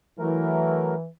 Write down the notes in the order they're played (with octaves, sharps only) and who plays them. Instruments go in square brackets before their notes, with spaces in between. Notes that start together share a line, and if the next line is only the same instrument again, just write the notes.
[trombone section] E3 [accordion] F#3 A3 A#4